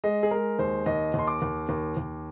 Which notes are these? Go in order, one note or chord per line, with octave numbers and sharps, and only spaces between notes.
G#3 D#5
G#4
G#3 A#4
D#2 C5
D#2 D#5
D#2 C6
D6
D#2
D#2
D#2